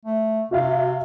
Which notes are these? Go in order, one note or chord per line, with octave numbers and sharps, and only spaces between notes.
A3
C3 F#4 E5 F5